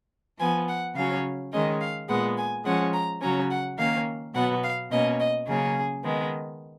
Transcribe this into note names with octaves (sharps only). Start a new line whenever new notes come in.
F3 B3 G#5
F#5
C#3 F#3 C#4 F5
D#3 G#3 C#4 D#5
F5
A#2 G#3 B3 F#5
G#5
F3 G#3 C#4 F#5
A#5
C#3 F#3 C#4 A#5
F#5
D#3 A#3 C#4 F5
B2 F#3 B3 F#5
F5
B2 A#3 C#4 D#5
D#5
C#3 F#3 A#3 C#4 G#4
D#3 G#3 B3